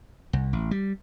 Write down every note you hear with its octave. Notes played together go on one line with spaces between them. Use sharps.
C2
A1
G3